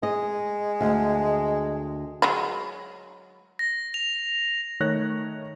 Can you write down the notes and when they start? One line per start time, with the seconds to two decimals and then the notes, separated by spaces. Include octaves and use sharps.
0.03 G#3 D#5
0.81 D2
2.22 F#3 G#3 B5
3.59 A#6
3.94 F7
4.80 D#3 A3 C#5 F#6 A#6